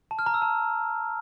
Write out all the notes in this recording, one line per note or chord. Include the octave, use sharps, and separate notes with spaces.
A5
F6
A#5
E6
A5